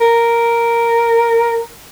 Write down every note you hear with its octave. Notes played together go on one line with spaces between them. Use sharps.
A#4